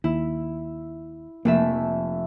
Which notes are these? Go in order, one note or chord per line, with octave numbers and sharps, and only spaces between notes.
D#2 E4
F1 A3 A#3 E5